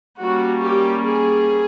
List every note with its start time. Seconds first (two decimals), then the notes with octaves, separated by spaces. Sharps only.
0.19 G3 A#3 C#4 F#4
0.63 G4
1.05 G#4